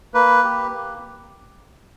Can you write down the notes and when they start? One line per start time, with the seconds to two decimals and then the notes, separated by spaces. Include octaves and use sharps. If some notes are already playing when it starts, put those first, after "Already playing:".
0.14 A#3 B4
0.44 G4
0.73 A#3